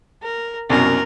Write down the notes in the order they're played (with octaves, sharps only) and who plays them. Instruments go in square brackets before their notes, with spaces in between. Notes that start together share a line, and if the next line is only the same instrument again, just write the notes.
[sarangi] A#4
[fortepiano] C2 F#2 B2 [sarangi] A#4